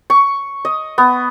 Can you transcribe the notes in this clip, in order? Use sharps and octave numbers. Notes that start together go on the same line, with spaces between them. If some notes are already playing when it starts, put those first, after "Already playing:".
C#6
D#5
B3